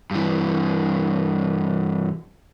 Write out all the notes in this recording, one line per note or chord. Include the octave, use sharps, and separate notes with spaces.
G2 E3